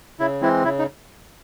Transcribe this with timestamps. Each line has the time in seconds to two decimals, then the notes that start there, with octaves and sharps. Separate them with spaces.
0.20 C#3 E4
0.41 E3 G#3 C4 E4
0.64 C#3 E4
0.79 D#4